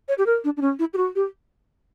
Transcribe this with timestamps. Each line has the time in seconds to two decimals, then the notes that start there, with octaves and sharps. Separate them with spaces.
0.08 C#5
0.18 G4
0.26 A#4
0.44 D4
0.57 D4
0.61 C#4
0.79 E4
0.93 G4
0.97 F#4
1.15 G4